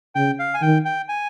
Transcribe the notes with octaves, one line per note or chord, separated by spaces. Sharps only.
C#3 G5
F5
G#5
D#3 G5
G5
G#5